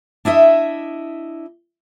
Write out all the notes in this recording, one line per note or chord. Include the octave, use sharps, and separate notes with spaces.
D4 E4 D#5 E5